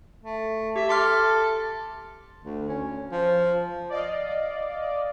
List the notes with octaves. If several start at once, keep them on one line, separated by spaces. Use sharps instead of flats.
A3
G4 E5
A4 C6 D6 F6
D2
C#4
F3
D5 D#5 F5